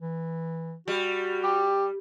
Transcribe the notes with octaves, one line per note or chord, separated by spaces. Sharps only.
E3
G3 F#4
G4